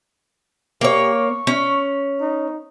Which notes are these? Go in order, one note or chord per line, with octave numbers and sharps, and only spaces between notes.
A#3 G4 C#5
C#6
C#4
D#4